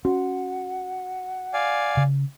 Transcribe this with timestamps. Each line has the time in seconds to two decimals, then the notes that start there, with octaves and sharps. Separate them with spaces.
0.05 C#4 F#4 F#5
1.54 D5 F5 G#5
1.97 C#3